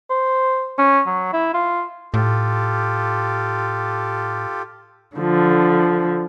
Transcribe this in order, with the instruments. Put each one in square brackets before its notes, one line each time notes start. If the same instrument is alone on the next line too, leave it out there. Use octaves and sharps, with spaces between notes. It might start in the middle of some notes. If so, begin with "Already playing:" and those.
[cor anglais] C5
C#4
F#3
E4
F4
[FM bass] A2 [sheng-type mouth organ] F4 G4 A4
[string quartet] D3 F3